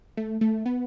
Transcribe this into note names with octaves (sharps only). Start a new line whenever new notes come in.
A3
A3
B3